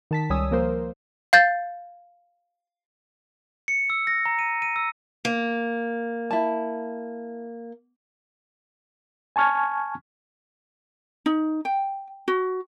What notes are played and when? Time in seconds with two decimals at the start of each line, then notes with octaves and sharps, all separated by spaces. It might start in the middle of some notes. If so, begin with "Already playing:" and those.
0.11 D#3 A5 B6
0.30 C#2 G3 C#5 G#5 D#6 E6
0.51 F3 A#3 A#4 C5
1.33 F5 G6 A6
3.68 C#7
3.90 E6
4.07 A#6
4.26 A#5
4.39 D#7
4.62 D#7
4.76 E6
5.25 A#3
6.31 E4 A5
9.36 G#5 A5 C#6 F6 G#6
11.26 D#4
11.65 G5
12.28 F#4